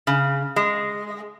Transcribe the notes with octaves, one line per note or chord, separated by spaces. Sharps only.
C#3
G#3